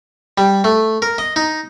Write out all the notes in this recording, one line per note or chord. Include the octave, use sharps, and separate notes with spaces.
G3
A3
A#4
D#5
D#4